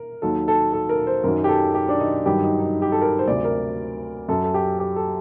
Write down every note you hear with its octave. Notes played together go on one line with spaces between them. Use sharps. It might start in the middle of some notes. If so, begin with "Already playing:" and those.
Already playing: A#4
D#2 D#3 F#3 A4
A4
A4
A#4
C5
F#2 D#3 F#3 A#4
G4
A4
G4
D4
D#4
G2 D#3 F#3 G4
D#4
D#4
G4
A4
A#4
C5
D2 C3 F#3 D5
A#4
F#2 F#3 A4
A4
G4
G4
A4